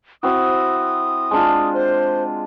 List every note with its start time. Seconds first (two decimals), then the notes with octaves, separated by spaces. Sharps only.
0.23 C4 E4 F#4 D#6
1.31 G#3 D4 F4
1.74 C5